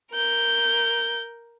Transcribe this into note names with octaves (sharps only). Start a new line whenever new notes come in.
A#4 G6